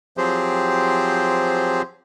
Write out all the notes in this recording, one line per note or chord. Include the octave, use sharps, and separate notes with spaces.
F3 F#3 C4 G4 G#4 C5